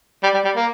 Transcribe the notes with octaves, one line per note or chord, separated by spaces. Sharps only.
G3
G3
G3
A#3